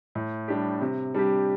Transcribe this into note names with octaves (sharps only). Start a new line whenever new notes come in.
A2
G3 D4 G4
C3
G3 D4 G4